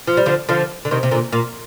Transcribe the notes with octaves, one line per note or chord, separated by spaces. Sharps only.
F3
G3
D3 F3
D3 F3
D3
C3 D#3
C3
A#2 D3
A#2